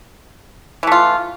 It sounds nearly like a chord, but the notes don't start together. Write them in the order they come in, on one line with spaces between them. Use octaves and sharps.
E3 A3 F4